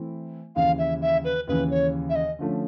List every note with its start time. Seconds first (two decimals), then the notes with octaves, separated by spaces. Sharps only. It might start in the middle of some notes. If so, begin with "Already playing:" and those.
Already playing: E3 A3 C4 E4
0.56 D#2 C#3 E3 F5
0.78 E5
1.01 E5
1.24 B4
1.47 D#2 C#3 E3 B4
1.71 C#5
2.10 E5
2.15 D#5
2.39 D3 F3 A3 C#4